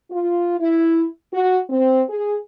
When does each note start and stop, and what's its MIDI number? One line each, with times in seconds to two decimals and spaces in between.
0.10 0.57 65
0.60 1.05 64
1.33 1.59 66
1.70 2.02 60
2.08 2.35 68